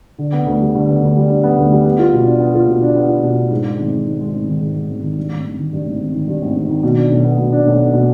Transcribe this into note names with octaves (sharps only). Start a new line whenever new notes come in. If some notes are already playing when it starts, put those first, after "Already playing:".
D3
B3
D2
G3
D3
B3
D2
G3
D3
B3
D2
G3
B3
F4
B2
D4
B3
F4
B2
D4
B3
F4
B2
D4
G#2
G#3
G#1
D#3
G#2
G#3
G#1
D#3
G#2
G#3
G#1
D#3
G2
G#1
G#1
D#3
G2
G#1
G#1
D#3
G2
G#1
G#1
D#3
B2
D4
B1
B3
B2
D4
B1
B3
B2